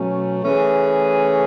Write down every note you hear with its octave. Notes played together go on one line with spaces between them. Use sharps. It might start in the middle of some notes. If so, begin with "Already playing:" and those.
Already playing: B2 F#3 A3 C#4
E3 A3 C#4 G#4